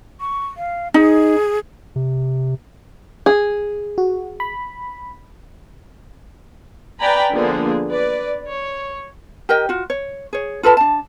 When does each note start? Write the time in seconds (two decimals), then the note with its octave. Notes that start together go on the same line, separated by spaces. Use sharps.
0.20 C#6
0.57 F5
0.94 D#4 G#4
1.96 C3
3.26 G#4
3.98 F#4
4.40 B5
7.00 B4 D5 G5 G#5 A#5 B5
7.32 D3 F3 A#3 B3 D4 G#4
7.89 B4 D5
8.48 C#5
9.49 G4 A#4 D#5 G5
9.69 F4 F#4
9.90 C#5
10.33 G#4 C#5
10.63 F4 A4 B4 A5
10.77 D4 A5